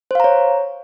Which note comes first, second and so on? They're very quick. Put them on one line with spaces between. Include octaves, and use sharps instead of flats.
C5 F5 A#5 C#5